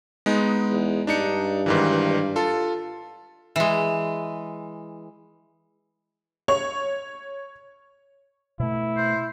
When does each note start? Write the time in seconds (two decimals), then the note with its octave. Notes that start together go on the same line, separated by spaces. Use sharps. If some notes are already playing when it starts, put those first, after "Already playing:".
0.26 G#3 B3 D#4
0.71 E2
1.07 G2 D4 D#4 C#7
1.66 G#2 D#3 E3
2.36 F4 A4
3.56 E3 G#3
6.48 C#5 C#6 F7
8.60 B2 A3 E4
8.97 C5